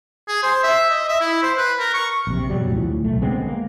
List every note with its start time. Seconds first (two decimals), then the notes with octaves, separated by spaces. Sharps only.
0.28 G#4
0.43 C5
0.63 E5
0.90 D#5
1.08 E5
1.21 E4
1.42 C5
1.57 B4
1.79 A#4
1.94 C#6
2.27 A#1 C3
2.50 F#2 B2 F#3 G3
2.69 D2 A2 F3
3.04 B1 A3
3.22 D3 G#3 B3 C4
3.47 A#3